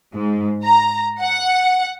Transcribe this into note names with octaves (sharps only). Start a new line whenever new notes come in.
G#2
A#5
F#5